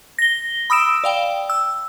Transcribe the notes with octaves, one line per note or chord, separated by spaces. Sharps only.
A#6 G7
B5 D#6 E6 D7 E7
D5 F5 G5
E6